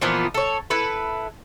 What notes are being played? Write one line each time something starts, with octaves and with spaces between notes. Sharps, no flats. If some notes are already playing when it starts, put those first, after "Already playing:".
A#2 E3 F3 B3
A4 C#5
E4 A4 B4